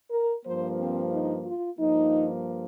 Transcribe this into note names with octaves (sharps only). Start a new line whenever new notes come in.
A#4
G2 F3 A#3 C5
C4
D#4
F4
G2 F3 A#3 D#4